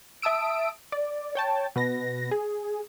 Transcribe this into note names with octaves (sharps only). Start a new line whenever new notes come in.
E5 A5 D#6 E6 D7
D5
C#5 G5 A5
B2 B4 A#6
G#4